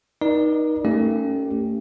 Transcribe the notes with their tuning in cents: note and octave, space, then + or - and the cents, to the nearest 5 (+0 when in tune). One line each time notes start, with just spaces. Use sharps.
D#4 +0 A#4 +45 D5 +20
A3 +40 C#4 +10 G4 -5